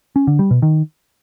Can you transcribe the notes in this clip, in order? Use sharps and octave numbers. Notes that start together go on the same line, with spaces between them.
C#4
D3
G3
B2
D#3